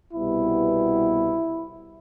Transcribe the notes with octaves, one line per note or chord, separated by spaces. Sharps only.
C2 B2 G3 B3 E4